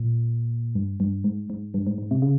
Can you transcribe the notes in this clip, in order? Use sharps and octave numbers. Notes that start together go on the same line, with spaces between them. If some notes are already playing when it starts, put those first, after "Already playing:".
Already playing: A#2
G2
G2
G#2
G#2
G2
G#2
G#2
C3
C#3